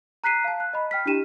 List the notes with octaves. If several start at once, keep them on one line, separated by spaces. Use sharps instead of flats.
A#5 F#6 B6 C7 D#7
F5 A5
F#6
D#5 B5
G5 F6 B6
D4 E4 G4 D#7 E7